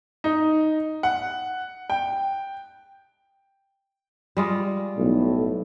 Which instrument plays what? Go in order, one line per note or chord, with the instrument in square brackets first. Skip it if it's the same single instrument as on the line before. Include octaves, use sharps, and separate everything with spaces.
[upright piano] D#4
F#5
G5
[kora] G3 G#3 F4
[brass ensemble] B1 A2